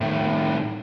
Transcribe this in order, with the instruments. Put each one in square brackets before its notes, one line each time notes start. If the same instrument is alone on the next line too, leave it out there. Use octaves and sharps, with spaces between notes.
[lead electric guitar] A2 D#3